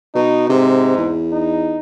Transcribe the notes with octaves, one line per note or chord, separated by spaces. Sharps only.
B2 D#4
G#2 C3
E2
D#4